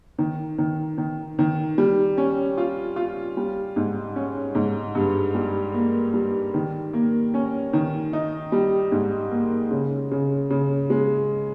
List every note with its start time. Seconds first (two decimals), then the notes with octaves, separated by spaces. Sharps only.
0.18 D#3
0.58 D#3
0.98 D#3
1.39 D#3
1.78 G3
2.17 C#4
2.58 F4
2.96 F4
3.37 G3
3.76 G#2
4.16 C#4
4.55 G#2
4.95 G2
5.35 G3
5.74 A#3
6.14 G3
6.54 D#3
6.93 A#3
7.34 C#4
7.73 D#3
8.13 D#4
8.52 G3
8.92 G#2
9.31 A#3
9.71 C#3
10.11 C#3
10.50 C#3
10.90 G#3